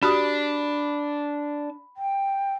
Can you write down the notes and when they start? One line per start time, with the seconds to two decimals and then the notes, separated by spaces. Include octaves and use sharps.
0.03 D4 F#4 G4 B5 D#6
1.97 G5